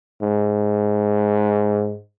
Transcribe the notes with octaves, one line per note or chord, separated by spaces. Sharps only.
G#2